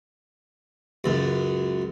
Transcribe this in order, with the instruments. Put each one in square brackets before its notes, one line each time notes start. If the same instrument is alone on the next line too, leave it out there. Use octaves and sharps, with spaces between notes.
[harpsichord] C#2 F#2